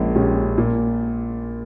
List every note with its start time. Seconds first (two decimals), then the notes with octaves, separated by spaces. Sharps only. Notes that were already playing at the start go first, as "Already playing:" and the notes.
Already playing: A#1 A#2 G#3 C#4
0.15 A#2 G#3 C#4 G4
0.58 A#2